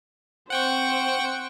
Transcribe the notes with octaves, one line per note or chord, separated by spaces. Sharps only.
C4 C5 F#5 G5 C#6